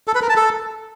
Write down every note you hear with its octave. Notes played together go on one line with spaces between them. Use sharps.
A4
B4
A#4
A5
A4